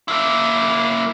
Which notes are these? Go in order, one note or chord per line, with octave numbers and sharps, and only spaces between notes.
A#3 E4